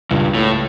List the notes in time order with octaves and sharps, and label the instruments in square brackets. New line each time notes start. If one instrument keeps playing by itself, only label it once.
[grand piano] C#2 [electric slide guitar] G2
[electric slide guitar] A2